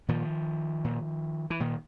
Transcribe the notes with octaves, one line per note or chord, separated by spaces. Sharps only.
A#2 D#3 F3
A#2
E3
A#2 D#3